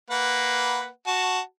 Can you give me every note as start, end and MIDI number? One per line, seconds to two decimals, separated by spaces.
0.10 0.88 58
0.10 0.88 71
0.10 0.88 78
1.07 1.40 66
1.07 1.40 81